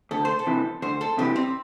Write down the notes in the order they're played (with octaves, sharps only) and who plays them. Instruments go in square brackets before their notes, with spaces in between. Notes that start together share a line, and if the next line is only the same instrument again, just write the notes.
[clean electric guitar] D2 [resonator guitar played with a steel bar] A4
[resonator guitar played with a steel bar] C5
A4
[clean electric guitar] C3 E3
[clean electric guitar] D2 [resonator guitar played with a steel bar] C5
[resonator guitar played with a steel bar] A4
[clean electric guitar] C3 E3 [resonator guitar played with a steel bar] G4
[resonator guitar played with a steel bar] C4